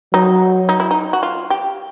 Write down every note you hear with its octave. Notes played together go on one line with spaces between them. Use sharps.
F#3 D#4
D#4
E4
D#4
F#4
F4
G4